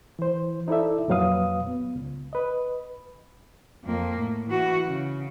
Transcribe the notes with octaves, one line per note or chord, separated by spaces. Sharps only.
E3 C5
D#4 E4 A4 D5 E5
F2 A#2 F#3 B4 F5 D#6
B3
C#2
B4 D#5
F2 A#3
A2
E3 F#4
C#3